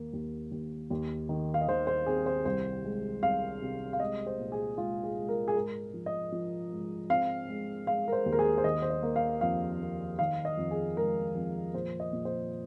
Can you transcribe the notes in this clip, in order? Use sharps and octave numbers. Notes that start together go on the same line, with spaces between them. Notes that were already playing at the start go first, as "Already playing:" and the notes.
Already playing: D#2 A#3
D#2
D#2
D#2
D#3
F5
D#5
D#3 C5
C5
C4 G#4
C5
C2 C5
G#3
C2 F5
C3
F5
G#3 D#5
C5
A#2
G#4
G#3 F4
G#4
G#3
A#4
G#4
G#2 A#4
F3
D#5
F3
G#2
C4 F5
G#3
G#3 F5
A#4
C5
D#2
A#4
G#4
C5
D#3 D#5
C5
D#5
A#3
F5
F2 F5
A#3
D#3 F5
D#5
F2
G#4
G#3 A#4
F2
A#2 C5
D#5
A#2
C5